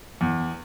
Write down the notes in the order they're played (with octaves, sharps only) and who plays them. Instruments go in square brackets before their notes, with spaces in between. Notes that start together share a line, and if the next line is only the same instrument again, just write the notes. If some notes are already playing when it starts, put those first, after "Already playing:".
[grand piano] E2